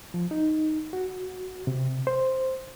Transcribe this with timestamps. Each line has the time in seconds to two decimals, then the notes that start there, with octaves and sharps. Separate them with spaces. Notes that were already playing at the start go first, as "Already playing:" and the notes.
0.14 F3
0.31 D#4
0.93 F#4
1.67 C3
2.07 C5